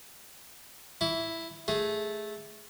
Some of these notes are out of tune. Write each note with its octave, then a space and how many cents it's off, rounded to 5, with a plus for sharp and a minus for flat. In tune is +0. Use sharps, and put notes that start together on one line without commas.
E4 +0 C#6 +40
A3 -10 G#4 -5